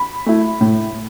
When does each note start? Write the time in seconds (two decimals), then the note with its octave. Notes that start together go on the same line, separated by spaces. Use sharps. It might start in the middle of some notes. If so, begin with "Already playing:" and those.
Already playing: B5
0.26 A3 E4
0.61 A2